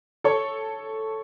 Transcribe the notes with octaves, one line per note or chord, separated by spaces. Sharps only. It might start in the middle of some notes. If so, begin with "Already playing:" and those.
A4 C#5